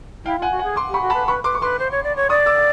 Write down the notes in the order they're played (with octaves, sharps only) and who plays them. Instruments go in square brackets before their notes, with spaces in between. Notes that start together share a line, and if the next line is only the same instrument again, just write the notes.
[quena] E4 [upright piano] F5 G5
[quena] F4 [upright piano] F#5 G#5
[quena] F#4
[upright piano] F#5 G#5
[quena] G#4
[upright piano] C6 D6
[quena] G4 [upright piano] B5 C#6
[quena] F#4
[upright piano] A5 B5
[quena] B4
[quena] B4 [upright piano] B5 C#6
[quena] B4 [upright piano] C6 D6
[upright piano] C#6
[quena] B4 [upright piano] C6 D6
[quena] C5
C#5
D5
C#5
[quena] D5 [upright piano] C#6 D#6
[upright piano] D6 E6